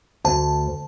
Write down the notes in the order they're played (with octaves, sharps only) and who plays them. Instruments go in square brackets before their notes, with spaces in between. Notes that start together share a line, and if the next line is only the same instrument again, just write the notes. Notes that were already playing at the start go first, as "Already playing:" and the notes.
[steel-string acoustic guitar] D2 [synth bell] A5